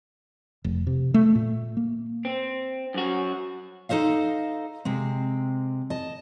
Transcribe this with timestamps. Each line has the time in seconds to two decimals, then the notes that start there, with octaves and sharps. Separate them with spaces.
0.64 F1
0.87 C3
1.14 A3
1.35 A#2
1.77 A#3
2.25 C4
2.94 F#2 F#4
3.89 D#4 A4 C5 D#5 F5
4.85 C3 G#3 C4
5.90 D#5 A5